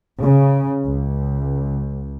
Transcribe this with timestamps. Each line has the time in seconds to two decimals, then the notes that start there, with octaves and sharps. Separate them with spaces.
0.21 C#3
0.85 C#2